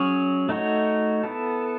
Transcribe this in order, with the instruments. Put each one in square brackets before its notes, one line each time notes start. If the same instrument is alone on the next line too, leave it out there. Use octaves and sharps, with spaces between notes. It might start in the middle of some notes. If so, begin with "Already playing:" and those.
Already playing: [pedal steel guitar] F#3 C#4 G#4 C#5
A3 D#4 F#4 C#5
B3 E4 A4